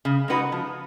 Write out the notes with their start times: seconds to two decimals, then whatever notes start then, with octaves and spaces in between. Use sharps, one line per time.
0.05 C#3
0.28 G#3 D#4 F#4 B4
0.52 F3